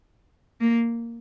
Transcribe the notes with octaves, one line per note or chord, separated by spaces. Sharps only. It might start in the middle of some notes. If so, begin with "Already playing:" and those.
A#3